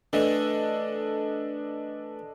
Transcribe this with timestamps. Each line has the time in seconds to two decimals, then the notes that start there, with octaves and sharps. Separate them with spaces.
0.13 E3 A3 D4 A4 D#5